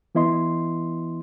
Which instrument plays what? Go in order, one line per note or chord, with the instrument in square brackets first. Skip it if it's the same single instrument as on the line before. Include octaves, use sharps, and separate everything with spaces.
[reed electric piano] E3 B3 E4 D#5 C6